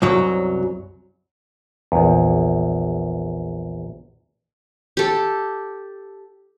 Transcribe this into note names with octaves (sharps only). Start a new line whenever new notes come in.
C2 F#2 F#3
A#1 E2
G4 A4